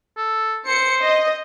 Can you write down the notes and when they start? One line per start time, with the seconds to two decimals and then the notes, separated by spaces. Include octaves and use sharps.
0.17 A4
0.67 C5 C#7
1.02 D#5